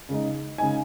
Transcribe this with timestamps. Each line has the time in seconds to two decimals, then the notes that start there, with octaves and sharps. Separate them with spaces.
0.09 C#3 G#3 D#4
0.58 C#3 G#3 D#4 G#5